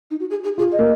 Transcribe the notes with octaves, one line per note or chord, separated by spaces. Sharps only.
D#4
F#4
G#4
G#4
F4 G#4
D#5
A#3